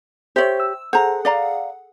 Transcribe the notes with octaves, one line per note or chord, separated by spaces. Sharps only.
G4 C5 C#5 E5
E6
G#4 A4 C5 F#5 A#5
D5 F5 A#5